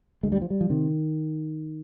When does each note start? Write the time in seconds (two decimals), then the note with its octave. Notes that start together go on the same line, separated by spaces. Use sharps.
0.23 D2 G#3
0.32 G3
0.42 F3
0.50 G3
0.61 F3
0.70 C3 D#3